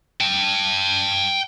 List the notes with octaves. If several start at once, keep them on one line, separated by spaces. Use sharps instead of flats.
G5 A5